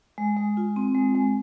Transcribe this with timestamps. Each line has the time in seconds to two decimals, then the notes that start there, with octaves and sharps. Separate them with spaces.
0.18 G#3
0.37 G#3
0.57 F4
0.76 C4
0.95 G#3
1.15 G#3